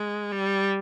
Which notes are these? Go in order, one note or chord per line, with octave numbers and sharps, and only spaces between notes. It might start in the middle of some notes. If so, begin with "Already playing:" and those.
Already playing: G#3
G3